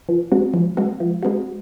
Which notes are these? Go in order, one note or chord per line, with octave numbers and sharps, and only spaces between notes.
F3
G#3 C4 F#4
F3
G#3 C4 F#4
F3
G#3 C4 F#4